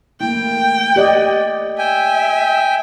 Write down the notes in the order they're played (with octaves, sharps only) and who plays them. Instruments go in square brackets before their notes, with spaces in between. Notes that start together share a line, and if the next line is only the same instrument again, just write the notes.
[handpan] A3 A#3 E4 [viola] G5
[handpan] G4 D5 D#5
[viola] E5 [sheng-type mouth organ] G5 G#5